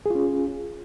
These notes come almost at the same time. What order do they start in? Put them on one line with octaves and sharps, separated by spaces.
G#4 F4 C#4